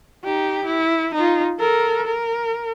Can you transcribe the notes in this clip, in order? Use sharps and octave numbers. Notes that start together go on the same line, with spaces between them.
D#4 G4
E4
D#4 F4
A4 A#4
A#4